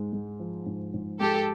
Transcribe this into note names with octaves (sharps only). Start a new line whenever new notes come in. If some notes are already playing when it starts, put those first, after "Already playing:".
Already playing: G#2 G#3
G#3
F3
G#2
G#2
G#3 G4 A4